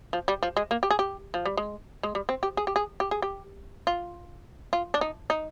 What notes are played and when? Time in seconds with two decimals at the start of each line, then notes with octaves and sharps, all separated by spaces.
0.13 F3
0.28 G3
0.43 F3
0.57 G#3
0.71 A#3
0.83 G4
0.91 G#4
0.99 G4
1.34 F3
1.46 G3
1.57 G#3
2.03 G#3
2.15 G3
2.29 C4
2.43 G4
2.57 G#4
2.67 G4
2.76 G#4
3.00 G4
3.11 G#4
3.22 G4
3.87 F4
4.73 F4
4.94 D4
5.01 D#4
5.30 D#4